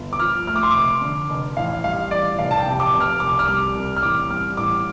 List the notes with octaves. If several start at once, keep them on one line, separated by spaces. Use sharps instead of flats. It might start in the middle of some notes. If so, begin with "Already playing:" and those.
Already playing: G1
D6
F3 F6
A3 F6
D6
C6
F1 D6
D3
F1
A1 F5
G3 F5
A1 D5
F1 F5
A5
G5
C3
D6
F1
F6
C2 D6
F6
G3 D6
C2
F6
A1 D6
G3 F6
A1 D6